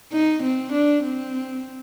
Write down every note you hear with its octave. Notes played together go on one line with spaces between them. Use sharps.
D#4
C4
D4
C4